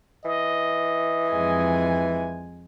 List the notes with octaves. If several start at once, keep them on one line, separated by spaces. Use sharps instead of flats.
E3 D#5
F2 G#3 G#5